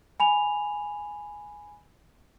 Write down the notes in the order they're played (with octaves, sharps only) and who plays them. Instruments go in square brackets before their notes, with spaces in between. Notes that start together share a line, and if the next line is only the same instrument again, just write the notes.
[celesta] G#5 B5 F7